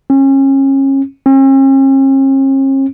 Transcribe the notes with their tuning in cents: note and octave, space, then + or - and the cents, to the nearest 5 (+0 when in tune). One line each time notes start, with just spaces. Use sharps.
C#4 -30
C#4 -45